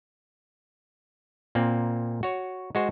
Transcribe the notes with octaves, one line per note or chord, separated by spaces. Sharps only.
A#2 A#3 C4
F#4 C#5
G#3 F#4 C5